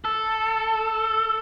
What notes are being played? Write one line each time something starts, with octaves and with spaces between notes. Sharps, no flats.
A4